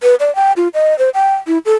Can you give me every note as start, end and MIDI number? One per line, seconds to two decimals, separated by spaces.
0.03 0.15 71
0.20 0.34 74
0.35 0.52 79
0.57 0.68 65
0.74 0.97 75
0.99 1.10 72
1.14 1.35 79
1.47 1.58 64
1.65 1.74 69